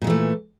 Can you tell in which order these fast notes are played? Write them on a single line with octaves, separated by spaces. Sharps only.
A#2 G#3 E3 A3